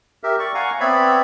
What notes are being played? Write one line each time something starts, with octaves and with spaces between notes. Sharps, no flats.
G4 A#4 E5
D5 C#6
F5 F#5 G#5 A#5 C#6
B3 C4 C#5 D5 E5 B5